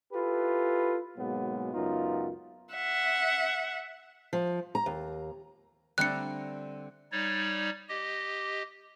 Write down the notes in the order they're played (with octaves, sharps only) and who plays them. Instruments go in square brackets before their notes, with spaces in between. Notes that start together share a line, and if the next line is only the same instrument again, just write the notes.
[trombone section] E4 F4 G4 A4 B4
G#2 B2 F#3 G#3 A#3 B3
C#2 F#2 B3 D#4 F4
[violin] E5 F#5
[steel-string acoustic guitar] F3
A#5
D#2
[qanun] D3 C4 A#5 [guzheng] G3 A3 D4 [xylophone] F#6 C#7
[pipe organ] G3 D#4 C#5 D5
G4 D#5